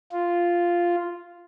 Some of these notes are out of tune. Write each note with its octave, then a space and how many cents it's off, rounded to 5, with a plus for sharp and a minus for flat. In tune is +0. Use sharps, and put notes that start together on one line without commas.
F4 -5